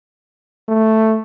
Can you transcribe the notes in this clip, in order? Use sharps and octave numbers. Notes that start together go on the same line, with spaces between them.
A3